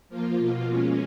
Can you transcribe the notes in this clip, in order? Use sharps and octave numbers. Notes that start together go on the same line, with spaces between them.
F3 A#3 F4
B2 A#3 F4
B2 G#3 C#4